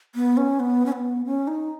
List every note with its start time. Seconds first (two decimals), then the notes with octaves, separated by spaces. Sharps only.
0.15 B3
0.37 C#4
0.60 B3
0.86 C#4
0.92 B3
1.26 C#4
1.47 D#4